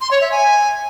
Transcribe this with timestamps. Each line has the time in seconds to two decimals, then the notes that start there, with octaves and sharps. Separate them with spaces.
0.01 C6
0.11 C#5
0.21 E5
0.31 G#5